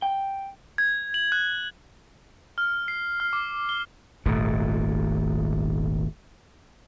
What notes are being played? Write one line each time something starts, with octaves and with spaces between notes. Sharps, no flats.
G5
G#6
F#7
F#6
F6
C7
F6
D6
G7
D#1 G#1 A#2 A3